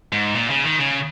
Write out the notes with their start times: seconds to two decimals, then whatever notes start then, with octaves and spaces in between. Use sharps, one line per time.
0.13 G#2
0.35 A#2
0.50 C#3
0.64 D#3
0.79 C#3